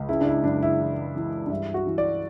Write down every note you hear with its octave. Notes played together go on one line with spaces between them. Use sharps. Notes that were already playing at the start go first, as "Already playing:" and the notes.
Already playing: C#2
C#3 E4
D4
E4
F#2 D4
E4
E3
E3
D4
G2 E4
F#4
E3
D5